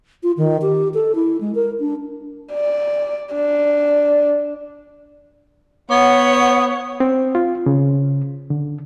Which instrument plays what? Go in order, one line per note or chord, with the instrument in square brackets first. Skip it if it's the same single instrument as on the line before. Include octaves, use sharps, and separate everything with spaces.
[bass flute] F4
D#3
G4
A4
E4
G#3
A#4
D4
[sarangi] D5
D4
[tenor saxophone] B3 [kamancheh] C#5 F#5
[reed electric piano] C4
F4
C#3
D3